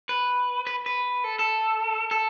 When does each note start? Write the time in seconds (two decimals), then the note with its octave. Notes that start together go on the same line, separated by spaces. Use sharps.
0.09 B4
0.67 B4
0.86 B4
1.24 A4
1.39 A4
2.11 A4